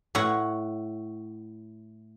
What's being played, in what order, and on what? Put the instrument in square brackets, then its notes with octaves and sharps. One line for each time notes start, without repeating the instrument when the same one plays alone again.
[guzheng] A2 C#5 F#5